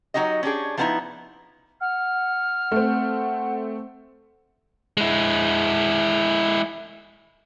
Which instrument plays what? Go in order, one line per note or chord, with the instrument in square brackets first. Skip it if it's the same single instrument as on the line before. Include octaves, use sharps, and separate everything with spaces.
[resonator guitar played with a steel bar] F#3 D#4 F#4 G4 D#5
C#4 D4 G4 G#4
F3 A3 B3 C4 D#4 E4
[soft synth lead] F#5 [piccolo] F6
[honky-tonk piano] A3 C4
[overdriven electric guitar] G#3 E4